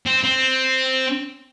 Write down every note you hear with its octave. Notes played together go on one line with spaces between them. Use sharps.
C4
C4